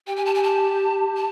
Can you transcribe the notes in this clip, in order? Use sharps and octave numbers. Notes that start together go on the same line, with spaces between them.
G4 G5
G#5
A5
G#5
A5
A5